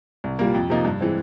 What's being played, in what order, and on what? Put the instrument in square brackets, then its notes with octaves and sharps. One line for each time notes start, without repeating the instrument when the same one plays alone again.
[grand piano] C2
A#2 G3 A#3
F2
C3 F3 A#3 D#4
G2
E3 G#3 C4